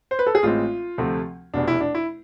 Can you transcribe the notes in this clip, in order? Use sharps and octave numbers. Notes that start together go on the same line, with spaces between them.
C5
B4
A4
G#4
A1 A2 G#3 C4 F4
D2 C3 F3 A3 C4
F1 E2 B2 B3 D4
E4
D4
E4